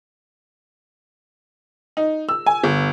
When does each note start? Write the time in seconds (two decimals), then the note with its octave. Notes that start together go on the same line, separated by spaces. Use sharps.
1.97 D#4
2.29 E6
2.46 G#5
2.64 G1